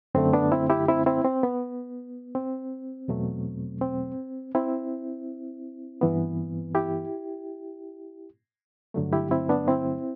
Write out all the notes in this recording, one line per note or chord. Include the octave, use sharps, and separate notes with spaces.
F#2 D3 A3 C4
B3 D4
C4 E4
E4 G4
C4 E4
C4 E4
C4
B3
C4
E2 B2 F#3 A3
C4
C4 E4
G2 E3 B3
E4 G4
G2 D3 F#3 A3
E4 G4
C4 E4
B3 D4
C4 E4